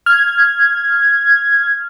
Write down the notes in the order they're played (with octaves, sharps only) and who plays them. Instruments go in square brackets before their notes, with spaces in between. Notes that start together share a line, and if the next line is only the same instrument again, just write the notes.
[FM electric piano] F6 [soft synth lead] G#6